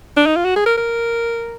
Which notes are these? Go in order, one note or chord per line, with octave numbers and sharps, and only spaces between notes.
D4
D#4
F4
F#4
G#4
A#4
A#4